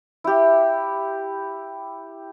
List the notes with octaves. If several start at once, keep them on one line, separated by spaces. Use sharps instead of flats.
E4 G4